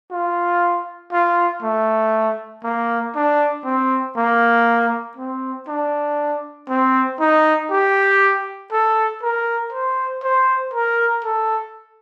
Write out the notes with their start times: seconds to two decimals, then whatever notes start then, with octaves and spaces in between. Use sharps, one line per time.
0.11 F4
1.12 F4
1.62 A3
2.64 A#3
3.15 D4
3.65 C4
4.17 A#3
5.17 C4
5.68 D4
6.69 C4
7.20 D#4
7.70 G4
8.72 A4
9.23 A#4
9.73 C5
10.23 C5
10.74 A#4
11.25 A4